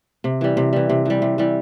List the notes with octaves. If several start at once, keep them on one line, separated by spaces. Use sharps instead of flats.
C3
E3 G3
C3
E3 G3
C3
E3 G3
C3
E3 G3